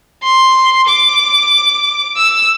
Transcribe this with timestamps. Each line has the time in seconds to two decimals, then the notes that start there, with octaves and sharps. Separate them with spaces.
0.23 C6
0.88 D6
2.17 E6